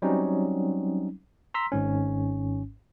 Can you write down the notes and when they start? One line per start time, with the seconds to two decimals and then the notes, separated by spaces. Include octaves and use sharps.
0.02 F#3 G3 C4 C#4 D#4
1.54 A#5 C6 E6 B6
1.72 G#1 G#2 C#4